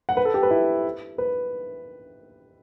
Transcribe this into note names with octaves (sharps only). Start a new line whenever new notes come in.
F#5
B4
A4
G4
B4
E4
B4